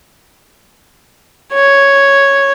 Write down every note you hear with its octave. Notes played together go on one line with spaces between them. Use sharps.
C#5